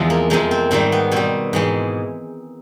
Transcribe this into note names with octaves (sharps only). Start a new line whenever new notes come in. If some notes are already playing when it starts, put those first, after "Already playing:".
Already playing: E2 C3 F3 G#3
A#3
F2 C3 F3 G#3 A#3
C4
G#2 D#3 G3 C4
B3
B2 G3 C4
G#2 E3 G#3